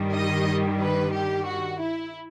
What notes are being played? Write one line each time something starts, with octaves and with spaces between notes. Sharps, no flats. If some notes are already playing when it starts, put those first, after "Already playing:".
Already playing: G2 D#3 G3
D#5
B4
G4
F#4
E4